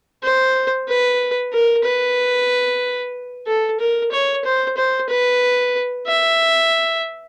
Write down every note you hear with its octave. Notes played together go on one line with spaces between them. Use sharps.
C5
B4
A#4
B4
A4
A#4
C#5
C5
C5
B4
E5